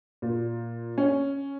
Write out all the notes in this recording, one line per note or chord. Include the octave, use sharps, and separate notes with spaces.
A#2
C#4